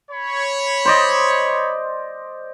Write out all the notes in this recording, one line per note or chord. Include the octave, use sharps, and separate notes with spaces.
C#5 B5
C5 D5 D#5